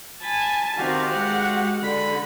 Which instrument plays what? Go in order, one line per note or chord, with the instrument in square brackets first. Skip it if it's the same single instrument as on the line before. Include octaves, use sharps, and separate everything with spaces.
[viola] G#5 A5 [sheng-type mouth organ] B5
[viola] D#3 C4 [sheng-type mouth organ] F#4 G4 F5
[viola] G#3 F#5
[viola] D3 [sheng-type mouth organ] B5